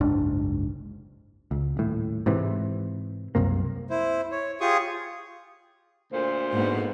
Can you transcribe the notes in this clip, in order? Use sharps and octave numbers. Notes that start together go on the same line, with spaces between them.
F#1 C2 G#2 D4
C#2
D#1 A2
G#2 C3 E3
C2 F#2 C3 A#3
E4 C5
C#5
F4 G4 G#4 C#6 D#6
D2 A#2 C5
G#2 A#3 B3